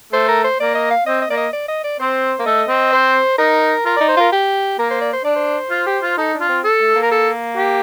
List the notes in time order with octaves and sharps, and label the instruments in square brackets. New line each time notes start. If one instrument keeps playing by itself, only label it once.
[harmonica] A3 [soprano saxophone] C5
[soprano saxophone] A#4
C5
[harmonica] A#3 [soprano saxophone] D5
[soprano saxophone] D#5
F5
[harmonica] C4 [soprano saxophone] D#5
[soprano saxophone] D#5
[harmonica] A#3 [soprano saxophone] D5
[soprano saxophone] D#5
D5
D#5
D5
[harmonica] C4 [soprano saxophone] C5
[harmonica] A#3
[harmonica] A3 [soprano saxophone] D#5
[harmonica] C4
[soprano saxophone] C5
[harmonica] D#4 [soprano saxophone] A#4
[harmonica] F4 [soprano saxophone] A#4
[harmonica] D5
[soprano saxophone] D#4
[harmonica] C5
[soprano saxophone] F4 [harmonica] A#4
[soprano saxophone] G4
[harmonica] A#3 [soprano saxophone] A#4
[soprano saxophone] C5
D5
C5
[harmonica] D4 [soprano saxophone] D5
[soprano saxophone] C5
[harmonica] F4
G4
F4
[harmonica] D#4 [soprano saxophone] A4
[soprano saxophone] D4
[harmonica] F4
[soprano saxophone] C4
[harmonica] A4
[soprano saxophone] A3
A#3
[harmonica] A#4
A4
G4